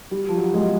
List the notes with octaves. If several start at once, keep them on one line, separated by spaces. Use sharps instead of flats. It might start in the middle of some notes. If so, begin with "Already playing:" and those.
G3
F3
F#3
G3
G#3